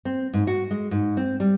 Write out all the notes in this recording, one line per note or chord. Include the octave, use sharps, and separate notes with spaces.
C4
G#2
F#4
G#3
G#2
C4
G3